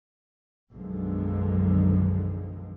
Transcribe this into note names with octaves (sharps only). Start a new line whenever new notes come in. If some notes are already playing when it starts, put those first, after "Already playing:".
B1 F#2 D3 D#3 F3 G#3